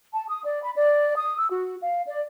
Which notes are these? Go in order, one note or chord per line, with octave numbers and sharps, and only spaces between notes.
A5
D#6
D5
B5
D5
D#6
E6
F#4
F5
D5